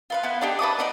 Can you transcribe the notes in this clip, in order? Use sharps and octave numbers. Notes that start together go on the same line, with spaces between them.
F4 B4 F5
B3 E4
D4 D#4 G4
B4 A5 D6 D#6
B3 D#4 D5